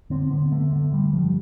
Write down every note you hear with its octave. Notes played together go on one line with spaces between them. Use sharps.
D3 C4
D3 B3
D3 A3
D3 A3
D3 G3
G2 F3